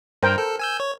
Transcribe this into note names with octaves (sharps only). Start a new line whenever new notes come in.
G2 A#4 C5 G5
A4
G#5 E6 G6
C#5